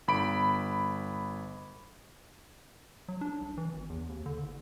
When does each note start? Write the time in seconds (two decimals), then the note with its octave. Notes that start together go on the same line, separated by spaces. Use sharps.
0.08 G1 B5 D7
3.08 F#3
3.21 D4
3.41 C2
3.57 E3
3.73 G#1
3.90 E2
4.09 D#2
4.26 D3
4.43 F#1